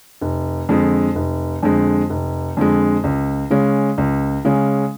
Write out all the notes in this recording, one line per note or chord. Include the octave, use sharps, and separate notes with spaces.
F1
F2 D3 G#3
F1
F2 D3 G#3
F1
F2 D3 G#3
C#2
C#3 G#3 C#4
C#2
C#3 G#3 C#4